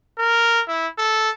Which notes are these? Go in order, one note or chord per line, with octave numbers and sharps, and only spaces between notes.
A#4
E4
A4